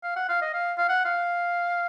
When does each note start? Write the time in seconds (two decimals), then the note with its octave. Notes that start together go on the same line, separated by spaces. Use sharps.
0.03 F5
0.16 F#5
0.29 F5
0.42 D#5
0.54 F5
0.78 F5
0.89 F#5
1.05 F5